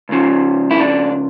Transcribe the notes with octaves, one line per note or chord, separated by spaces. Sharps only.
C#2 C#3 F3
E4
D4